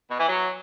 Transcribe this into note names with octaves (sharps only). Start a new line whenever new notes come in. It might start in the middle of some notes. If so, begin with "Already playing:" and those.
B2
E3
F#3